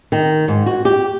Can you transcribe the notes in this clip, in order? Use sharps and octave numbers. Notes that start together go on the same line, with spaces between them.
D#3
G#2
F#4
G4